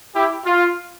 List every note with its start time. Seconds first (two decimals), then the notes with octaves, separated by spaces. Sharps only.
0.15 E4 G4
0.46 F4